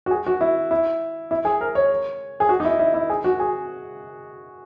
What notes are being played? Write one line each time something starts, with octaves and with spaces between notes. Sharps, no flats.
F#4
G#4
F#4
E4
E4
E4
G#4
A#4
C#5
G#4
F#4
D#4
E4
E4
E4
G#4
F#4
G#4